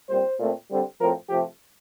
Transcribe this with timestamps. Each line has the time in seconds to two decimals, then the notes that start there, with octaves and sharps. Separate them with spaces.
0.09 A#2 G3 C4 C5
0.39 A#2 A3 C4
0.69 D3 G3 C4
0.99 A2 F3 C4 A#4
1.30 C3 F3 A3 G4